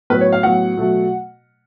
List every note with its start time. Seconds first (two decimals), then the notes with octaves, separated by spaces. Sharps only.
0.10 A2 F#3 B3 B4
0.21 C#5
0.32 F5
0.43 A2 F#3 B3 F#5
0.77 B2 F#3 A3